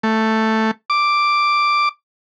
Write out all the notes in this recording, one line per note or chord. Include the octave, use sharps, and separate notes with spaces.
A3
D6